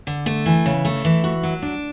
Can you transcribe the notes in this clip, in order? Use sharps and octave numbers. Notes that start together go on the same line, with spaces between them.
D3
A3
E3
C#3
A3
E3
F#4
F#3
D4